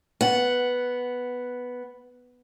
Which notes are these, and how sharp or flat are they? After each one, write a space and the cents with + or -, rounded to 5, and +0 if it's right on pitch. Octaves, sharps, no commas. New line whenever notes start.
B3 +0 F#5 +0